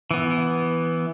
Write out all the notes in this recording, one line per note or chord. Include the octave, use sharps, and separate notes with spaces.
E3 B3